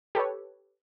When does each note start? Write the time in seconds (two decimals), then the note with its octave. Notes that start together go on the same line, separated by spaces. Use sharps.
0.15 G4 A4 B4 C#5